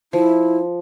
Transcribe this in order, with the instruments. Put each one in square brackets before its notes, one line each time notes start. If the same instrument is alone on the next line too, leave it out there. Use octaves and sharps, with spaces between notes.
[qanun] F3 [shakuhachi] E4